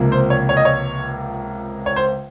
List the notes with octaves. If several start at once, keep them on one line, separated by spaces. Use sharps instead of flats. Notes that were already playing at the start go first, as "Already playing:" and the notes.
Already playing: C#2 C3 F3 A#3
C5
C#5
C#5
D#5
C#5
C#5
C5